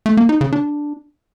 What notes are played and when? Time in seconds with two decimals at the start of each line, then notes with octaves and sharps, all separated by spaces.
0.06 A3
0.17 A#3
0.29 D#4
0.41 C#3
0.53 D4